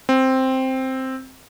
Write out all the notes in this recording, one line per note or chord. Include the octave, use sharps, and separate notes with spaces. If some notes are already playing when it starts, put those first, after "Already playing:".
C4